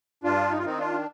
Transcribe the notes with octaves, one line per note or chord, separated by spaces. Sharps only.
G2 D4 F4
D#4
F4
D#3 C4 D#4
D4 F4